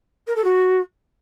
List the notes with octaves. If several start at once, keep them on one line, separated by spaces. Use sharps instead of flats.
A#4
A4
F#4